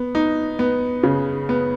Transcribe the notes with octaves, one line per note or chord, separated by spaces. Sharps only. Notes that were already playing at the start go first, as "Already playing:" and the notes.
Already playing: B3
D#4
B3
C#3
B3